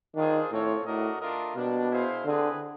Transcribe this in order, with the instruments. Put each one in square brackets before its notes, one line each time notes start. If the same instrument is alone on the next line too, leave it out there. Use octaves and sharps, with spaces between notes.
[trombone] D#3 [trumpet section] D4 F4 G#4 C5
[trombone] A2 [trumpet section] C4 F4 A4 C#5
[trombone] A2 [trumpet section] A3 D4 F#4 A#4 D#5
[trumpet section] A3 D4 F4 A#4 D#5
[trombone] B2 [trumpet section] G3 A#3 D4
[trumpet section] E4 G#4 C5 F5
[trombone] D3 [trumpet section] C4 E4 G#4 B4